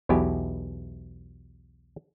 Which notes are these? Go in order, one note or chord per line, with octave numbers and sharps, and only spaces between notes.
B1 E2 B2 E4 G4 G#5